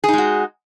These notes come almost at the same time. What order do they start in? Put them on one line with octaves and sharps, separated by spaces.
G#4 D#4 G#3 F#4